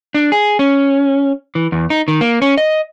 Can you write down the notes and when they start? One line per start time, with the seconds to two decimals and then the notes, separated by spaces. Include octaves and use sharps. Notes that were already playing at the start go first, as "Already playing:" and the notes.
0.15 D4
0.32 G#4
0.59 C#4
1.55 E3
1.72 E2
1.90 D#4
2.08 D#3
2.21 A#3
2.42 C#4
2.58 D#5